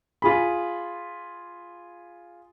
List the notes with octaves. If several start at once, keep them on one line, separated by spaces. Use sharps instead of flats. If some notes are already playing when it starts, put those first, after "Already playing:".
F4 G#4 B5